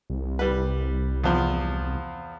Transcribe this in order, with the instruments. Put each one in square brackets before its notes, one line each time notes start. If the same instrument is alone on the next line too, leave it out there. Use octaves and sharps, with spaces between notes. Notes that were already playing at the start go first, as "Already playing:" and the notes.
[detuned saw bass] C2
[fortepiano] G3 B4
E2 F3